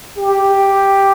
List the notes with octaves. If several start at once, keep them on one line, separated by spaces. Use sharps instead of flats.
G4